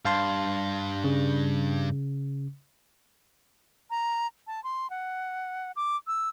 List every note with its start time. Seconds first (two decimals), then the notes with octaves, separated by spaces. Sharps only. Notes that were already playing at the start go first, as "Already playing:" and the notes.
0.05 G2 F5 A5 C6
1.04 C#3
3.90 A#5
4.47 A5
4.64 C6
4.90 F#5
5.76 D6
6.07 E6